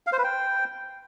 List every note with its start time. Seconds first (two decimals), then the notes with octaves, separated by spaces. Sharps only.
0.07 F5
0.12 C5
0.18 B4
0.24 G5